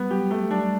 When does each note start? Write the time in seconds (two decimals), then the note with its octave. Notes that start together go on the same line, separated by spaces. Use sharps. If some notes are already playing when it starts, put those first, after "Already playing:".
Already playing: G3 B3
0.11 F#3 G4
0.31 F#3 A3
0.50 G3 D4